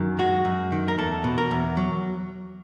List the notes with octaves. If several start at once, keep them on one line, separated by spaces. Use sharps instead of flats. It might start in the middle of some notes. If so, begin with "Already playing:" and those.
Already playing: F#2 D#3
G#3 F#4
F#2
D#3
A#4
E2 A4
B2
A#4
E2
F#3